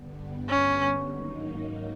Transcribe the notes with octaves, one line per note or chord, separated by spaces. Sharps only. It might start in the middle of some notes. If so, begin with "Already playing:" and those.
Already playing: G2 D3 G3 B3
C#4
G#2 D#3 F#3 A#3 D#4